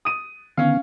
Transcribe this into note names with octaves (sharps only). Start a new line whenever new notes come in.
D#6 D#7
D3 D#3 B3 C#4 F5